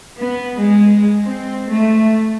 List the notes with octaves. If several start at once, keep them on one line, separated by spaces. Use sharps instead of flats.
B3
G#3
C4
A3